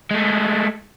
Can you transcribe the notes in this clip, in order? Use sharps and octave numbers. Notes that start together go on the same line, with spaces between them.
G#3 A3